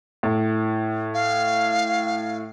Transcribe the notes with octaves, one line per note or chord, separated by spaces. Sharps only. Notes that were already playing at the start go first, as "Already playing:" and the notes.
A2
F5